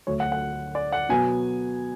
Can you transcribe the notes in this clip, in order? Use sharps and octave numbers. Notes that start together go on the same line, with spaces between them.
D2 D3 F#3 A3 C#5
F#5
F#5
D5
F#5
B2 F#3 B3 G#5